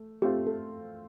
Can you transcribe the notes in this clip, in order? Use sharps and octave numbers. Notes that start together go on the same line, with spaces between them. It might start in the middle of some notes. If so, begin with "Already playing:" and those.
Already playing: A3
A3 C4 F4 G4
A4